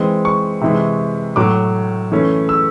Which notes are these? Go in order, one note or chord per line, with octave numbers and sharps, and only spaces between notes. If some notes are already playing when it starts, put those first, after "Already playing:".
Already playing: E3 G#3 C4
C#6
C3 E3 G#3
A2 F#3 A3 D6
E3 A3 C#4
E6